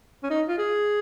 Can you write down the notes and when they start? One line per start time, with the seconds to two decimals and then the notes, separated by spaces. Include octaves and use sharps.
0.23 C#4
0.30 D#4
0.48 F4
0.58 G#4